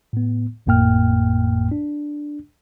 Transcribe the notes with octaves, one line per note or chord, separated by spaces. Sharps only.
A2 B3
G#1 F2 A2 A#3 G5 F6
D4